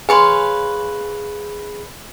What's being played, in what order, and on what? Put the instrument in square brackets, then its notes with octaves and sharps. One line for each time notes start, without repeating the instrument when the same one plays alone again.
[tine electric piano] G#4 [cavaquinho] B4 C#5 F5 [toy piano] G#5 C6